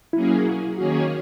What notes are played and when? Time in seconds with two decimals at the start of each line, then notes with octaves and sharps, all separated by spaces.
0.13 F#3 A#3 C#4 E4 G#4
0.78 D#3 A#3 C#4 F#4 G#4 C#5